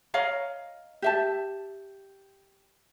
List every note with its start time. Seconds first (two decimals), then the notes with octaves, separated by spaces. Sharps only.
0.14 C#5 D#5 F5 A#5
1.02 G4 E5 A5